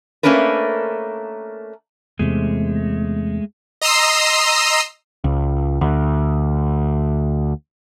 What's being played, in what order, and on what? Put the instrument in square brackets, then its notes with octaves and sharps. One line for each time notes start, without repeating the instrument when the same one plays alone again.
[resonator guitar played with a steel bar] A3 A#3 C#4 D4 A#4 B4
[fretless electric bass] E2 C3 [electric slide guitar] G#3 A3
[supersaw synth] D#5 A#5 C6 D#6 E6 C7
[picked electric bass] C#2
D2